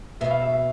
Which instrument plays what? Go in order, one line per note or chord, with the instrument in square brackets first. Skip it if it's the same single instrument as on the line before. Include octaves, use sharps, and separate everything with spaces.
[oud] B2 [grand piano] E5
[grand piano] F5
E5
E5